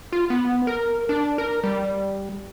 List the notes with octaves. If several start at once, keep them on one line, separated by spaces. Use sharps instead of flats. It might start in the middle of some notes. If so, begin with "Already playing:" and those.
F4
B3
A#4
D4
A#4
G3